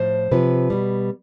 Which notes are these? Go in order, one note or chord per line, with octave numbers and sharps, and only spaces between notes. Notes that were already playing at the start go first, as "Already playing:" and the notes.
Already playing: A2 F3 C5
C3 F3 B4
B2 G3